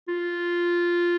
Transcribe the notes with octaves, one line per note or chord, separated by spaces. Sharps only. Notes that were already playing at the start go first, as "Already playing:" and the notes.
F4